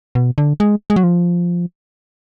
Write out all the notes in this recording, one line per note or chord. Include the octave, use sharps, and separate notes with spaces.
B2
D3
G#3
G#3
F#3
F3